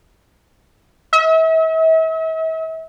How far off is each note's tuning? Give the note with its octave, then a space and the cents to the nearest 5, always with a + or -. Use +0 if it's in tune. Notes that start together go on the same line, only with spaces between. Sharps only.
E5 -40